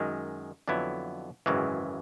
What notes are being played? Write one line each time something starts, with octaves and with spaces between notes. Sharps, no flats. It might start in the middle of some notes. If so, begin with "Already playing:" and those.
Already playing: F#2 D#3 G#3
F2 D3 F#3 B3 E4
G#1 F#2 C#3 E3 G#3